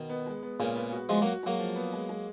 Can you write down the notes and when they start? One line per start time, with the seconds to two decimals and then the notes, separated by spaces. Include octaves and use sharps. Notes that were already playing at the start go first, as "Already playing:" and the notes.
Already playing: B2 D#3
0.09 B3
0.26 G#3
0.43 B3
0.59 A#2 C#3 G#3
0.76 B3
0.92 F#4
1.09 F3 G#3 F#4
1.22 F#3 A#3
1.26 F#4
1.43 F#3 G#3 A#3
1.59 F3
1.75 B3
1.93 G#3
2.09 G#3